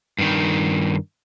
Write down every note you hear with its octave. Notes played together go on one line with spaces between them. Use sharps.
G2 D#3